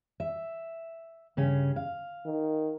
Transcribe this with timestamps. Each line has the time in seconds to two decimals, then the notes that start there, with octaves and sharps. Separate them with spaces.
0.20 E5
1.37 G2 C#3 C#4
1.76 F5
2.25 D#3